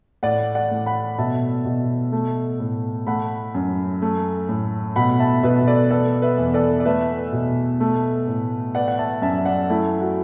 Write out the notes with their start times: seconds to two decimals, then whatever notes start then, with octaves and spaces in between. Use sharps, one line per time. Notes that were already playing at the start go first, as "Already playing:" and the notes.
0.23 A2 D5 F#5
0.55 D5 F#5
0.71 A2
0.86 F#5 B5
1.18 B2 E5 A5
1.65 B2
2.12 A3
2.60 A2
3.07 A3 F#5 B5
3.55 F#2
4.02 A3
4.49 A2
4.96 B2 F#5 B5
5.20 E5 A5
5.43 B2 B4 E5
5.67 A4 D5
5.91 B3 A4 D5
6.22 B4 E5
6.38 E2
6.54 A4 D5
6.80 D5
6.85 A3 B4 E5
7.32 B2
7.80 A3
8.27 A2
8.75 B3 D5 F#5
8.88 F#5
8.98 E5 A5
9.22 F#2 E5 A5
9.45 D5 F#5
9.70 A3 E4
10.01 F#4